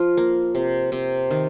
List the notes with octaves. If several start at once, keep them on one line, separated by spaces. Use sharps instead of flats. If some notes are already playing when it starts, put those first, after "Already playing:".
Already playing: F3 F4
A#3
C3
C3
D#3